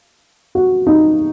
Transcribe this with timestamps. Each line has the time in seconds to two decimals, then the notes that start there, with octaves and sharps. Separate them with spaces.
0.55 F#4
0.87 D#4